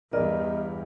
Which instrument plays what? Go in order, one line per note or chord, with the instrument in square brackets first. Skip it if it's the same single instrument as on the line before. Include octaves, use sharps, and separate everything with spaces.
[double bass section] E2 G2 [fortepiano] A#4 D5 [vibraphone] D#5